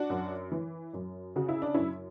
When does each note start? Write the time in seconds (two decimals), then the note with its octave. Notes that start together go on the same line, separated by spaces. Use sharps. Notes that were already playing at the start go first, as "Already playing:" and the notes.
Already playing: D4 F#4
0.10 F#2
0.52 E3
0.94 F#2
1.36 C#3 F#4
1.49 E4
1.62 D4
1.74 F#2 C#4 E4